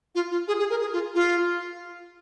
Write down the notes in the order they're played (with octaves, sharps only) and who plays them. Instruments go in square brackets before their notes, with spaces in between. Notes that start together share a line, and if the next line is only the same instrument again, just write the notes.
[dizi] F4
F4
G#4
G#4
A#4
G#4
F4
F4